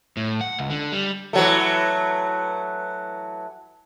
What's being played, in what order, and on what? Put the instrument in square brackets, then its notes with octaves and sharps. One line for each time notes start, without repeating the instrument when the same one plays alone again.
[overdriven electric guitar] A2
F#5
C#2
D3
G3
[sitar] E3 F#3 A3